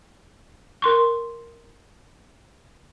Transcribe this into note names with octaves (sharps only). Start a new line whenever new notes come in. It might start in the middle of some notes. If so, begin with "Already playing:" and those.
A#4 C6 C#6